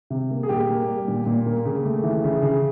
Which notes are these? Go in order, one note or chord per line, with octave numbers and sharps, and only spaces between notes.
C3
A#3
G#4
A#2 G4
A#3
G3
A#2
A#2
A#3
C#3
A3
E3
C#3
C#3